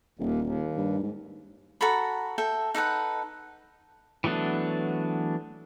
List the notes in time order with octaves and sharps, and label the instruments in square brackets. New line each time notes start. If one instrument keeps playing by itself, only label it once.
[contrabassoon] D#1 [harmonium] D#2
[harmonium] D#2
[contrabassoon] G2
G#2
[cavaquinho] F#4 A4 A#5 B5
A4 E5 G5
D#4 A4 B4 F#5
[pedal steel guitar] E3 F#3 A3 B3 D4